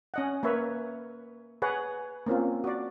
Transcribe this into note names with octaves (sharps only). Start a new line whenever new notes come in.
C#4 D#5 F#5
A#3 B4 C#5 E5
G#4 B4 C#5 F#5
A#3 C4 C#4 F4
F#4 D5